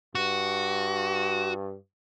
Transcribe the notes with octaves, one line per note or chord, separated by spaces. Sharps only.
G2 F#4